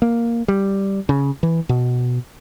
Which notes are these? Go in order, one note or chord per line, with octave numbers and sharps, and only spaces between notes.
A#3
G3
C#3
E3
B2